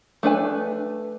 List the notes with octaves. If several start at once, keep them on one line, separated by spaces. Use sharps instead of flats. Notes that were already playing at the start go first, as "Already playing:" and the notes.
A3 D4 B4 G#5